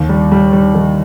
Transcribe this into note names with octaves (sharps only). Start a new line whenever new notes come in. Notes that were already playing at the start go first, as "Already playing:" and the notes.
Already playing: D#2
G3
G3
G3
D#3